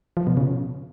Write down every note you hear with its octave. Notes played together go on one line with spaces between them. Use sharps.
F3
B2
C#3